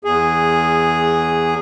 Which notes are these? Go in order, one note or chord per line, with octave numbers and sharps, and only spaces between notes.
E2 G#4